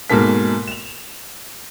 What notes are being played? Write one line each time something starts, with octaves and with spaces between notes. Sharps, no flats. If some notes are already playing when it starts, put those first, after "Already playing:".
G#2 B2 A#3 A4 A#4 B6
E7 F7